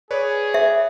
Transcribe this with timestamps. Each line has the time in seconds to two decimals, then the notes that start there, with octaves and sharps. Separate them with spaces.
0.11 G#4 B4 C#5 D5
0.54 E5